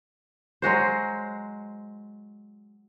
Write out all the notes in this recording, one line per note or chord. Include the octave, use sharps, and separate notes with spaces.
F#3 G#3 F#4 C5